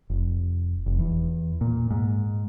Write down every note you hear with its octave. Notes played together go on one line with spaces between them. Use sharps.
F1
F1
E2
A#2
G#2